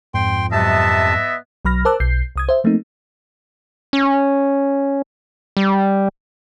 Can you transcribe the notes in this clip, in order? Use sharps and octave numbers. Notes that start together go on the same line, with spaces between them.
F2 G#2 G5 C6
G#2 C3 F#3 B3 D#5 E5 A5
B1 F#3 B5 F6 A#6
A#4 C5 A5 D6 E6 F#6
B1 G6 C7
C2 D#6 G#6
C5 E5
F3 A3 A#3 C4 D#4
C#4
G3